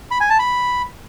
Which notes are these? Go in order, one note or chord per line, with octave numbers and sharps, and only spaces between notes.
B5
G#5
A5
B5